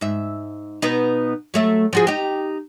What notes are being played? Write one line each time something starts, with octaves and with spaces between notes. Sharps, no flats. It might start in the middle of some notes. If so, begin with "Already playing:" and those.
G#2 E5
B2 B3 D#4
F#3 A3 E5
F3 F#4 G#4
D#4 G4